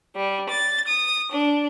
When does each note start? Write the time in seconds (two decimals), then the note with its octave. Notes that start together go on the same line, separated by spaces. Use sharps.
0.15 G3
0.48 A6
0.87 D#6
1.31 D4